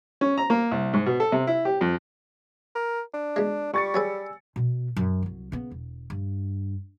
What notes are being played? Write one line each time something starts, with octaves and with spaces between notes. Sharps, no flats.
C#4
A#5
A#3
C2
G#2
B2
A4
C3
E4
G4
F2
A#4
D4
B2 G#3
G3 C#6 A6 C#7
F#3 G#4 B4 G#5 E6
B2 B3
F#2
C2 F#3
C#3 B3
E1
G2